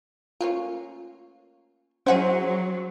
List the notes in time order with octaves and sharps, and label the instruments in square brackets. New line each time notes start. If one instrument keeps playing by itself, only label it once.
[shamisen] A3 A#3 C#4 [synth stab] F4
[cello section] F#3 [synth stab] C#4 E4 G#4 [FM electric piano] C5 [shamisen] D#5 F#5 G5